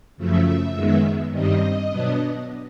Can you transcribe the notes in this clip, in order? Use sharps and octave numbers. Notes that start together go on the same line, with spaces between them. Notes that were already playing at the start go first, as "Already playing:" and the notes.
F#2 C#3 F3 A3 E5
F#2 D#3 G#3 B3
G2 D#3 G3 C4 D#5
B2 F#3 B3 D4